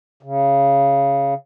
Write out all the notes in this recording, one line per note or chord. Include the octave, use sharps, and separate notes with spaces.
C#3